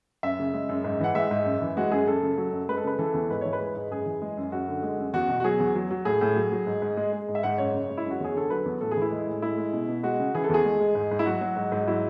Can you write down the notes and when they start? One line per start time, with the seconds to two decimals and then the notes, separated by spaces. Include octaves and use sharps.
0.23 F#2 E5
0.39 C#3
0.54 G#3
0.69 F#2
0.84 G#2
1.00 E3 F#5
1.15 G#3 E5
1.31 G#2
1.45 F#2
1.62 E3
1.77 G#3 F#4
1.91 F#2 G#4
2.07 F#2 A4
2.22 C#3
2.38 F#3
2.53 F#2
2.69 G#3 B4
2.77 A4
2.84 C#3 B4
2.99 E3 A4
3.14 E2
3.30 G#2 B4
3.41 E3 C#5
3.53 B4
3.60 G#3
3.75 G#2
3.91 F#2 G#4
4.06 E3
4.22 G#3
4.38 F#2
4.52 F#2 F#4
4.68 D3
4.83 G#3
4.99 F#2
5.13 E2 F#4
5.29 B2
5.40 F#4
5.44 F#3 G#4
5.60 E2
5.75 F#3
5.91 F#3
6.05 A2 G#4
6.21 A2
6.36 F#3
6.52 F#3
6.67 G#2
6.82 G#2
6.97 G#3
7.13 G#3
7.28 G#2
7.35 E5
7.43 G#2 F#5
7.58 F#2 C#5
7.74 C#3
7.90 G#3
7.98 E4
8.04 F#2
8.11 F#4
8.20 E2 G#4
8.35 D3 A4
8.50 F#3 B4
8.66 E2
8.81 A2 A4
8.91 G#4
8.97 E3 E4
9.12 G#3
9.27 A2
9.42 G#3 E4
9.58 G#3
9.73 B2
9.88 B2
10.03 G#3 F#4
10.19 C#3
10.35 E3 G#4
10.44 A4
10.49 E2 G#4
10.64 G#3
10.80 G#3
10.95 G#2
11.11 G#2
11.19 E4
11.26 F#3 F#4
11.41 F#3
11.57 G#2
11.72 G#2
11.87 F#3 E4